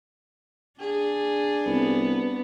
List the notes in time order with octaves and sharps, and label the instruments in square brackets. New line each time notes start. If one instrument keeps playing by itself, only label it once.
[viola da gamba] D4 [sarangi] G#4
[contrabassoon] C2 [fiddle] B3